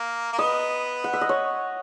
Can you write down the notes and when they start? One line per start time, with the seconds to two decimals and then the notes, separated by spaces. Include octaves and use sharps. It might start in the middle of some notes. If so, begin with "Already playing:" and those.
Already playing: A#3
0.33 A#3
0.38 B3 D#5
1.04 F#5
1.13 E5
1.21 D#5
1.29 C#5